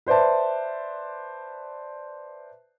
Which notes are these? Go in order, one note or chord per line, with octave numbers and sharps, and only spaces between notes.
B4 C5 D5 E5 A5